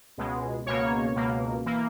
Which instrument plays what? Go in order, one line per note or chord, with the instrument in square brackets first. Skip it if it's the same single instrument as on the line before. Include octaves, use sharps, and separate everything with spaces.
[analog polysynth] C#2 B2 G#3
C#2 B2 A#3 C#5
C#2 B2 A#3
E3 A#3